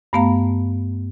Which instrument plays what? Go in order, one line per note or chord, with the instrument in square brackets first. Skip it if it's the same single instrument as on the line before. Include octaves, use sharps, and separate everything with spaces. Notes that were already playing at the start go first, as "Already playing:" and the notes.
[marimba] G2 A3 B3 F5 A#5